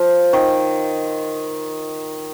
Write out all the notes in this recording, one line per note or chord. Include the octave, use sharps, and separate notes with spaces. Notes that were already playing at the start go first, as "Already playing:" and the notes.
Already playing: F3
D#3